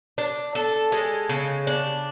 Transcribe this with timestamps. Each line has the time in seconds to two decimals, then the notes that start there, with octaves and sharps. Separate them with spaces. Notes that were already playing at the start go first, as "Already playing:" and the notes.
0.18 D4
0.55 A4
0.92 G#3
1.29 C#3
1.67 D4